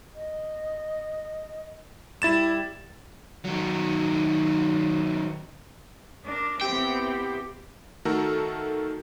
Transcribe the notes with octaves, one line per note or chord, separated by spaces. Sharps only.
D#5
G3 E4 A6 E7
D#3 F#3
D4 A#4
B3 C4 E4 G4 G5
D#3 A3 F#4 A4 A#4 A#5